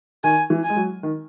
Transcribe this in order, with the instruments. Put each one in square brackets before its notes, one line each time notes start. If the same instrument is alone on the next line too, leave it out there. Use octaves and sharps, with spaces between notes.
[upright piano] D#3 [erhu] G#5
[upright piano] E3
[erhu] G#5
[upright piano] G#3
F#3
D#3